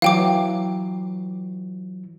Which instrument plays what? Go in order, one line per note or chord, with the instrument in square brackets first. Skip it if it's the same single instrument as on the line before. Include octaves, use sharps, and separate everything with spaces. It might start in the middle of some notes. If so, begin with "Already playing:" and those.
[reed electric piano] E3 F#3 [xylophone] F5 G5 D6